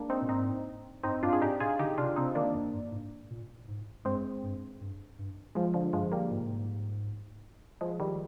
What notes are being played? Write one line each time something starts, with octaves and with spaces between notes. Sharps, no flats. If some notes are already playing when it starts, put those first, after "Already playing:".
Already playing: G#3 A#3 D4
C4 D#4
A#2
G#2 C4 D#4
G2 C4 D#4
G2 D4 F4
G#4
G#2 D#4 G4
A#2 F4 G#4
D3 D#4 G4
C3 D4 F4
C3 C4 D#4
D#3 A#3 D4
F2
G2
G#2
A#2
G#2
G2 G#3 C4
G2
G2
G2
F3 G#3
D3 F3
G2 F3 G#3
G3 A#3
G#2
A#2
G#2
F3 G#3
D#3 G3